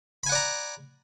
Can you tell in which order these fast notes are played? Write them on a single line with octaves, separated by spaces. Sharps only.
B5 G#5 F#5 D5 A#5